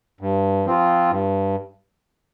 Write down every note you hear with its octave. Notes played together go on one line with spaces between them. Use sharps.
G2
F3 C4 F4
G2